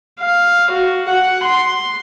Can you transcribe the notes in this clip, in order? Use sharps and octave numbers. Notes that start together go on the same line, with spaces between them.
F5
F#4
F#5
C6